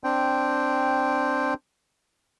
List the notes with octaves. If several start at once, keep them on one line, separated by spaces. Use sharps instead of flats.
C4 D4 G5